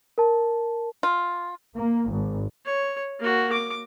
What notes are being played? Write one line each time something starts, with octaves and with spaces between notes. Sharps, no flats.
A#4 A5
F4
A#3
G#1
C#5
A#3 F#4
D6